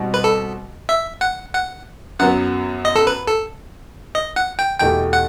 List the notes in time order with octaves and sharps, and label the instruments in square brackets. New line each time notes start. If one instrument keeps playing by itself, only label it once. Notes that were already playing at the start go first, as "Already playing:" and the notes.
Already playing: [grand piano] B2 G3 C4 D#4 F#4
[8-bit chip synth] B4
A4
E5
F#5
F#5
[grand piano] F#2 F#3 B3 [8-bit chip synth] F#5
[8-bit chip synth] D#5
A4
B4
A4
D#5
F#5
G5
[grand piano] E2 B2 A3 D#4 G4 [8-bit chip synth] G5
[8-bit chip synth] F#5